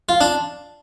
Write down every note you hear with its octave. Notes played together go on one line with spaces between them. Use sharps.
F4
D4